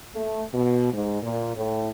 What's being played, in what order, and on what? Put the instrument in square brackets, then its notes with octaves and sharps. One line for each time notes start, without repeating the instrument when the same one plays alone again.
[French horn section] A3
B2
G#2
A#2
A2